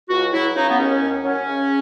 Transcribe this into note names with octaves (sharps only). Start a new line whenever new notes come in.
C#2 F#4
F#3 E4
C#3 D#4
B3
D#2 C#4
D#2
F#3 C#4
C#3